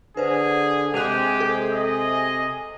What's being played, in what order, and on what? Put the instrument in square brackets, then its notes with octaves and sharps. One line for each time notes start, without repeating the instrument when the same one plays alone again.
[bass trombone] D3 [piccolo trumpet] G#4 [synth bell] B4 C5
[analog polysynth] C3 G#4 [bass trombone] G#3 [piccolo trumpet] G4 [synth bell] F#6 D#7 F7
[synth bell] A4
[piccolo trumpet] D#5